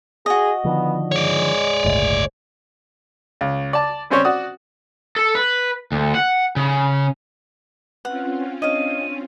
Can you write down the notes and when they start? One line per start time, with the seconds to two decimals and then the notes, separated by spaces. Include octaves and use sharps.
0.26 F#4 G#4 D#5
0.65 D3 D#3 F3 B3
1.12 G#3 C#5 D5
1.84 G1 C#2 A2
3.41 C#2
3.73 D5 A5
4.10 G3 C4 C#4 C5 C#5
4.25 F#4 D5 D#6
5.16 A4
5.35 B4
5.92 D2
6.15 F#5
6.56 C#3
8.05 C4 C#4 F4 B4 F#5
8.62 D4 C#5 D#5 F5 D#7